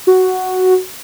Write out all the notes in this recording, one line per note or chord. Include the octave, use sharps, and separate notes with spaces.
F#4